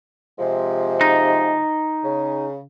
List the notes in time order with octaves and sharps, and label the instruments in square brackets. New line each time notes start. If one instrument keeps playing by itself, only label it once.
[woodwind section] C3 F3 G#3
[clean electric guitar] D#4
[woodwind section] C#3